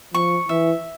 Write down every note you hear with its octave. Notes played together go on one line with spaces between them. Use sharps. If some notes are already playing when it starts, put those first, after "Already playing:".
F3 C#6
E3 E5